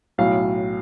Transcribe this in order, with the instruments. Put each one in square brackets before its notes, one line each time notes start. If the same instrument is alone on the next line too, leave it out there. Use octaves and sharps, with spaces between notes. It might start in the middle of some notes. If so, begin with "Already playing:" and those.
[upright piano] B1 A2 F#3 F5